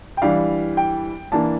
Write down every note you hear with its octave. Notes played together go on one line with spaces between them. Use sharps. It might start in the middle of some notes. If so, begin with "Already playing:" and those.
G5
E3 G3 D4 F5
G5
E3 A#3 D4 A5